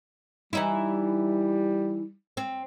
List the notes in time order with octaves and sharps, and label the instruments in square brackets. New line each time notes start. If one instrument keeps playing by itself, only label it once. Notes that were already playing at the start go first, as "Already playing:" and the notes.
[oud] E3 D#4 E4 [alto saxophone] G3
[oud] C4